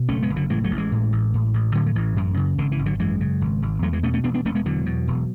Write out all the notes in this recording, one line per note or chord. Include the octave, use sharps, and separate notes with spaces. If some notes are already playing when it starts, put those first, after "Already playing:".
Already playing: B2
F#1 A3 C#4
G#3 B3
F#1
D3 F#3
A2 E3 G#3
F#3 A3
A1
E3 G#3
A2
A1
A2
A1
A2 D3 F#3
F#3
A1 E3
F#2
C#3
G#1 D3
E3
G#1
D3 F#3
F#2 E3 G#3
C#3
G#1
G#1
E2 F#3 A3
E3 G#3
B2 A3 C#4
A3 C#4
E1 B3 D4
B3 D4
E1 A3 C#4
G#3 B3
E2 D3 F#3
B2
E1